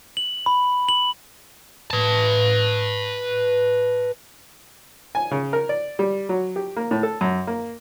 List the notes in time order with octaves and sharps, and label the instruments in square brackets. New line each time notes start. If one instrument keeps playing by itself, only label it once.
[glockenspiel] F#7
B5
F#7
[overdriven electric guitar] B4 A5
[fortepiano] G#5
C#3
A#4
D5
G3
F#3
G4
A#3
A2
A4
F#2
A#3